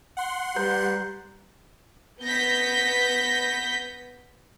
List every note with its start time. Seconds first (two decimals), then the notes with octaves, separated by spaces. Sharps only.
0.17 F#5 C6
0.56 G3 B4 A#5 G6
2.24 B3 G6 A#6 B6